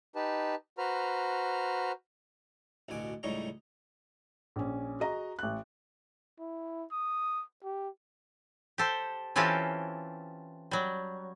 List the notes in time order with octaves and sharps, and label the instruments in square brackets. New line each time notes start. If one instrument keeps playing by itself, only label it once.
[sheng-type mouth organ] D#4 G4 B4 A5
F#4 B4 C5 A#5 F6
[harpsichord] A1 D2 B2 G#5 D6
C#2 A2 G3 D#4 C#5 A#5
[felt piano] A#1 C#4
F#4 G#4 D#5 A#5
A1 F#6
[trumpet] E4
D#6
G4
[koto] G4 A4 C5
E3 C4 C#4 F4 G4 A4
F#3 G3